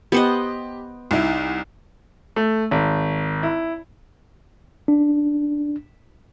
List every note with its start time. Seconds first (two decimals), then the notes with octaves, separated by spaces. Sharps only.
0.12 B3 G4 C5 D#5
1.11 C2 D#4 E4
2.36 A3
2.71 G#1
3.43 E4
4.88 D4